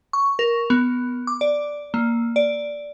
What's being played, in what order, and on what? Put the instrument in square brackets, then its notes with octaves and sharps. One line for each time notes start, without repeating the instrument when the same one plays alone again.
[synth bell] C#6
A#4
B3
D6
D5
A#3
D5